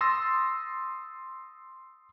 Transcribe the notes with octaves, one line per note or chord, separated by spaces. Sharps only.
C6 D#6 E6 A6 A#6